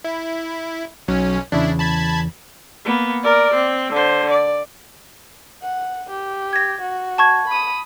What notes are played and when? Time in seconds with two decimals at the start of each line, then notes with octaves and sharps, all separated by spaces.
0.04 E4
1.08 B1 F#3 C#4
1.52 E2 C#3 D4 E4
1.79 A5 B5 G#6
2.85 A#3 B3
3.23 A#4 D5
3.54 C4
3.92 D3 C5
4.30 D5
5.62 F#5
6.10 G4
6.53 G#6 A#6
6.82 F#4
7.18 A5 C#6 G#6
7.48 B5 D#6